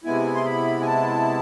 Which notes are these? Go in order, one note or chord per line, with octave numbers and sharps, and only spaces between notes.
C3 G#3 B3 E4 G#5
C6
B5
G#5
A5